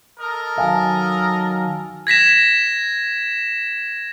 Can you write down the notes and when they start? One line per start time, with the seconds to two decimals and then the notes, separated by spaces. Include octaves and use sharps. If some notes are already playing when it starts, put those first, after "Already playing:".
0.20 A4 A#4 D#5
0.58 D#3 F#3 F5 G#5 A5
2.07 G#6 A#6 B6 E7